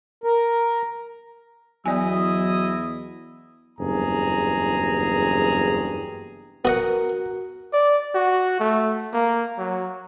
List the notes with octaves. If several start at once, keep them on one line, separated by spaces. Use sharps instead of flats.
A#4
E2 F#3 B3 E4 D5 D#5 G#5 D#6
F#1 E2 G2 G#4 A#5
B3 F#4 A#4 D#5 F#5
D5
F#4
A3
A#3
F#3